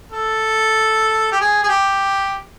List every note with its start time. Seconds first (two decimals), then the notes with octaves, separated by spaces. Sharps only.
0.12 A4
1.32 G4
1.41 G#4
1.63 G#4
1.69 G4